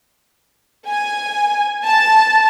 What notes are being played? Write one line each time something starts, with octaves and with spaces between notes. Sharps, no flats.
G#5
A5